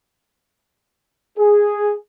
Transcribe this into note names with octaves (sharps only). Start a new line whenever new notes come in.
G#4